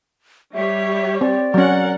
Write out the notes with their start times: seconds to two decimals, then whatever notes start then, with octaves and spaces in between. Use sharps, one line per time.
0.54 G3 G4 C#5 E5
1.21 C4 D5
1.54 F#3 C#4 A#4 F#5